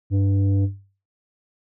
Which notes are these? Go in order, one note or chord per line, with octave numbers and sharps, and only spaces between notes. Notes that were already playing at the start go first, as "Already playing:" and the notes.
G2